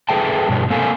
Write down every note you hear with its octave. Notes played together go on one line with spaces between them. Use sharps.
G#4 A4 B4 E5 G5 A5
G2 B2 G3 C#5
A#3 C4 A4 F5 G#5